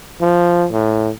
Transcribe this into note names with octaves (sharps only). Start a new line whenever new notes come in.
F3
A2